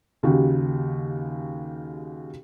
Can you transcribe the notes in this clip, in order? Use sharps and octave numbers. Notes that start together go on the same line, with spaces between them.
D#2 C#3 F#4 G4